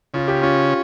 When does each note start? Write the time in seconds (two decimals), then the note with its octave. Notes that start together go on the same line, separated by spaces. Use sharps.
0.14 C#3 F4
0.28 G4
0.42 C#4 F4